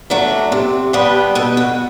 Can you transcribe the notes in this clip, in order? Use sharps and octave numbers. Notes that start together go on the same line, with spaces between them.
F#3 A3 D4
C3
G3 B3 D4
B2 A4
F#4